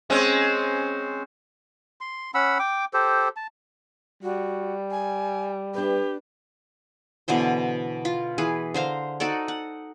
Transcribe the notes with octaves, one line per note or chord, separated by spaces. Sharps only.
G#3 C4 C#4
C6
C#4 F#5 B5 E6
G5 D6
G4 A4 C5
A5
G3 F#4
G#5
D4 G4 B4
B2 D3 E3 C5
F4
E3 G#4 B4
D3 C5 F5 A#5
D#4 F#4 A4 D5
F#5